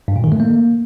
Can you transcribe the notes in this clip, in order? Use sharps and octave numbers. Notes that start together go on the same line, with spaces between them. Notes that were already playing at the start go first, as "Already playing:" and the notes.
G2
A#2
D#3
A3
A#3